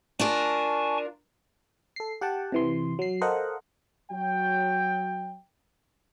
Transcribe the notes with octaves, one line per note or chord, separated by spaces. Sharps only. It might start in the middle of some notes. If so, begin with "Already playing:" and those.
D4 F4 A#4 G#5 A5 C#6
A4 C7
G4 F#5 G5 A5
C3 E3 C6
F#3 C7
A4 A#4 C5 D#5 F5 F#5
F#3 G5